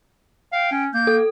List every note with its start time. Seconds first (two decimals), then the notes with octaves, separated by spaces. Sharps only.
0.52 F5 G5
0.71 C#4
0.94 A#3 G6
1.07 A4